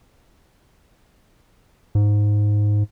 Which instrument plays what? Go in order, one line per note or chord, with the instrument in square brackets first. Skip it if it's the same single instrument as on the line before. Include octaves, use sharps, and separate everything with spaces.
[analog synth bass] G#2